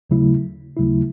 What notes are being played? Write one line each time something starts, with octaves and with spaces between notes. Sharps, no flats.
D#2 C#3 F#3 A3 E4
D#2 C#3 F#3 A3 E4